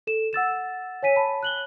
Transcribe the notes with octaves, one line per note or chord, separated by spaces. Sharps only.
A4 E7
F#5 E6 A6 E7
C#5 G#5 B6 D#7
A5 B5
F#6 F#7 G7